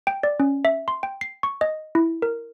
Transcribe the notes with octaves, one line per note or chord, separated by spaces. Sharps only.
G5
D5
C#4
E5
C6
G5
C7
C#6
D#5
E4
A#4